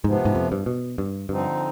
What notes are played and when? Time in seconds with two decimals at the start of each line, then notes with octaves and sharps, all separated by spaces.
0.04 G#2 C3 F3 B3
0.25 G#2
0.35 F2
0.52 G2
0.66 B2
0.98 G2
1.29 G2 D3 F3 C4 D#4